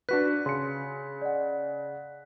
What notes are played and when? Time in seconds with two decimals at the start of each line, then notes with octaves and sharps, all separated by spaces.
0.09 D4 F#4 B4 F#6 B6
0.46 C#3 C6 C#7
1.22 D5 D#5 F#5